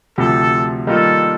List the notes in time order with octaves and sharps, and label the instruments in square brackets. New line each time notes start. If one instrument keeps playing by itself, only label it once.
[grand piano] D2 C3 F3 [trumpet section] A4
[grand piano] D#3 G3 A#3 F4 [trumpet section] A4